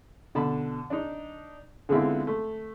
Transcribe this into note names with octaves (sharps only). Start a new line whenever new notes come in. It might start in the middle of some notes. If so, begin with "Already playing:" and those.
B2 D3 A5 B5
D4 D#4
D3 G#3 B3 C4 E4 F4
A3